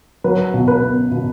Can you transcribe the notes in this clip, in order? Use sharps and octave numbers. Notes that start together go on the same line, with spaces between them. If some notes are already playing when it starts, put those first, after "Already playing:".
F#3 B4
B2
B4
B3
B2